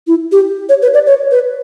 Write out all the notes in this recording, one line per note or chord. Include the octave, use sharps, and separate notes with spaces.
E4
G4
C#5
B4
D5
C#5
B4